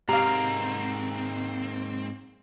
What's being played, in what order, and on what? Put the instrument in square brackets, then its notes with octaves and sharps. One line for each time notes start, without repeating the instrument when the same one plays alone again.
[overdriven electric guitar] G#2 A#3 [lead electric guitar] C4 [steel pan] G4 F5 [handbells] A#5